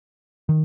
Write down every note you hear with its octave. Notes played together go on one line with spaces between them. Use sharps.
D#3